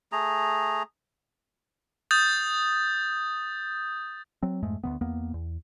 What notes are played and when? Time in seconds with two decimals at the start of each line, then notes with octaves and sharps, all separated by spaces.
0.12 A3 G#4 A#5
2.11 D#6 G6 A6
4.43 F#3 C4
4.63 F2 G#2 G#3 A3
4.84 D2 D#3 B3
5.01 E2 A#3 B3
5.34 E2